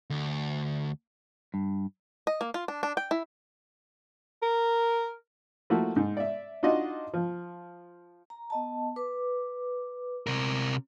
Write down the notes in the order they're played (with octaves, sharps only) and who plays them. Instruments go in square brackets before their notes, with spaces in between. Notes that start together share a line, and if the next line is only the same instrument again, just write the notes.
[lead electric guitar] D2
[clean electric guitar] G2
[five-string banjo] D#5
A#3
F4
D4
D4
G5
E4
[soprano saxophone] A#4
[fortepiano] F3 A3 A#3 E4 F#4
G#2
D5 E5
D4 D#4 F4 F#4 D#5
F3
[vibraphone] A#5
B3 D#5 A5
B4 D6
[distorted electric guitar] C3 A#4